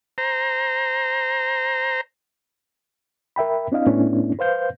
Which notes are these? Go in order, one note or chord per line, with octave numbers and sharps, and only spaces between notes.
C5 A#5
A#4 E5 G5 B5
C4 D4 E4 D#5 F5
A2 A3 B3 C#4 D4 E4
B4 C5 F5 G6